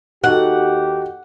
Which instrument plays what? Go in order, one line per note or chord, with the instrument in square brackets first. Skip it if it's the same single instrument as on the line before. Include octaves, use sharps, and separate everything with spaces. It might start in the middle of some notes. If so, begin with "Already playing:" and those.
[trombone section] D#2 G4 [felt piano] D#4 F#4 A4 [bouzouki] F#5